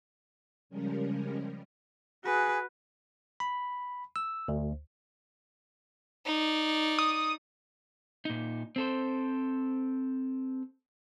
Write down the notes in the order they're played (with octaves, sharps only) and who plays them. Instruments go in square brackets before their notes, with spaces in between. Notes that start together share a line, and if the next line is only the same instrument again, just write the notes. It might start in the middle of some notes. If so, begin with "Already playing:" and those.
[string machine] C#3 F3 G3 G#3 C#4 A#4
[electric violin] F#4 B4 [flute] G#4
[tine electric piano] B5
E6
D2
[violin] D#4 D5
[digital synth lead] D#6
[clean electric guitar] A#2 D#4
C4 A4 C5